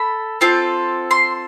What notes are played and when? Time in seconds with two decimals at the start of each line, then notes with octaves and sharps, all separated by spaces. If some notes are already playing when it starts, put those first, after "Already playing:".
Already playing: A4 B5
0.41 C4 F4 A4
1.11 C6